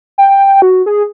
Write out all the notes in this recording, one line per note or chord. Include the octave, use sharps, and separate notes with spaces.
G5
F#4
G#4